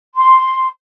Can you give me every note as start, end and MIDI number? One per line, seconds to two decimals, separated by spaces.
0.16 0.68 84